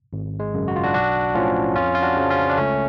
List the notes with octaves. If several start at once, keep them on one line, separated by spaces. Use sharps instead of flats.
G#1
G#3
F#2 C#3
F#4
F4
D4 F#4
B1 D4 F#4
A2 F3 C#4 F4
F2 C#4 F4
F4
D4 F#4
C#3 F3
C#4 F4
D4
C#2 A3 C#4